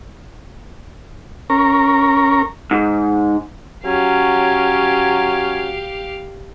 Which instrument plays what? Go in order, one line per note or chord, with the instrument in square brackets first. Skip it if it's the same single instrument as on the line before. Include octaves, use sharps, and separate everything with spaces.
[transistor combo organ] C#4 A#4
[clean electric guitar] G#2
[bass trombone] F#3 [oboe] C#4 [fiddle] G4 F5